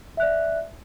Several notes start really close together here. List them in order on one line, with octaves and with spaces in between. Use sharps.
E5 F#6 D5